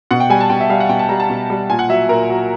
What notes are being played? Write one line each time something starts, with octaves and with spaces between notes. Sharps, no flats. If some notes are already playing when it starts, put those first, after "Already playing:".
B2 F#5
G5
G3 G#5
A5
B2 G5
E5
G3 F5
F#5
B2 G5
A5
G3 A#5
A5
B2
G3
A#2 G#5
F#5
F#3 E5
A#2 A#4
F#3